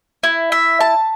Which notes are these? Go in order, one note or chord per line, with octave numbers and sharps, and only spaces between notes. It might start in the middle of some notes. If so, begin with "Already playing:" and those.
E4
E5
A5